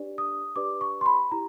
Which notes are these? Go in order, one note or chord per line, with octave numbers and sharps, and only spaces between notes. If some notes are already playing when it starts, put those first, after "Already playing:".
Already playing: D4 G4 B4 D5
D#6
D4 G4 B4 D5 D6
C#6
C6
B5
E4 G4 A#5